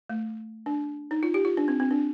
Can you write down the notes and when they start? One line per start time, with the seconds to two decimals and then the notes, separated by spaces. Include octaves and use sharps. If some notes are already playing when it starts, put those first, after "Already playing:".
0.10 A3
0.66 D4
1.11 D#4
1.23 F4
1.34 G4
1.45 F4
1.57 D4
1.68 C4
1.80 C4
1.91 D4